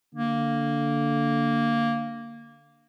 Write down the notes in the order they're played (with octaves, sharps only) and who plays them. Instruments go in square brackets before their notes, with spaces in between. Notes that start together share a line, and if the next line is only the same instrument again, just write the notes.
[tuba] D3 [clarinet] A#3